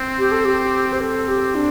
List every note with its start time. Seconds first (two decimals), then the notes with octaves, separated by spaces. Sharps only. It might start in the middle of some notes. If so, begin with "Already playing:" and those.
Already playing: C4
0.18 G4
0.32 A4
0.45 G4
0.93 C5
1.00 C4 A4
1.28 G4
1.55 D4